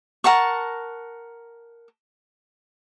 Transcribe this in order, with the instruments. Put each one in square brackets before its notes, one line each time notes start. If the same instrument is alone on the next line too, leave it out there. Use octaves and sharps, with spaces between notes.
[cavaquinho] A#4 F#5 A5 C#6